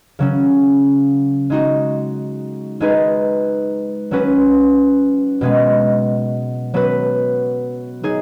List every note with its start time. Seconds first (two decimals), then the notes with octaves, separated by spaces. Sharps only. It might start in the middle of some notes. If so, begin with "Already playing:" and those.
0.19 C#3 F#3 C#4
1.50 G#3 D#4 F#4
2.80 G#3 D#4 G#4 B4
4.11 F#3 C#4 F#4 B4
5.41 B2 G#3 B3
6.74 F#3 B3 F#4 B4
8.03 F#3 D#4 G#4